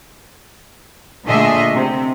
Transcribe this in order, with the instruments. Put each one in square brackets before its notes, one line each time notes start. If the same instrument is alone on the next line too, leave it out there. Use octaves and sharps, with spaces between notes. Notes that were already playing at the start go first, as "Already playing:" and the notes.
[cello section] A#2 D3 A3 G#4 D#5 E5
C3